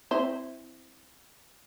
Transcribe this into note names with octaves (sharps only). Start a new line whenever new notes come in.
C4 E4 C5